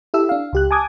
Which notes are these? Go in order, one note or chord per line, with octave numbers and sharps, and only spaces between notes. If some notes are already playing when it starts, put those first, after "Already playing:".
E4 G4 A4 E5 E6
D4 F5
C#2 G4 F#6
G#5 A5 D6 D#6 G#6